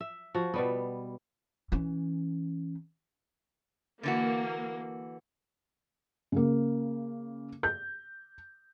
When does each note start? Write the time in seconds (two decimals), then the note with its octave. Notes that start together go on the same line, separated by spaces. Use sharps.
0.01 E5
0.35 F3 F#4
0.54 B2 G3 B3
1.72 E3 C#4
4.03 D3 E3 A#3 F#4
6.32 C#3 A#3
7.63 G6